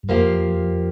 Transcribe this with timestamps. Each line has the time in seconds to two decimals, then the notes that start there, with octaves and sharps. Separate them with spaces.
0.03 G2
0.09 F2 F3 A#3 G4